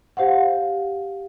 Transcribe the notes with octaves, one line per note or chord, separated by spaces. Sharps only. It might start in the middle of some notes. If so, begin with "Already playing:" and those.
G4 C5 F5 F#5